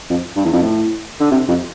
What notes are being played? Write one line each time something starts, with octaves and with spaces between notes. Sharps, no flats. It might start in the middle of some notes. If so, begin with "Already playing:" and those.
F2
G2
E2
F2
A2
D3
C3
F2